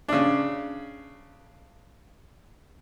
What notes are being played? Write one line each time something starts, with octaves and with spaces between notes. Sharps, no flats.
C#3 D4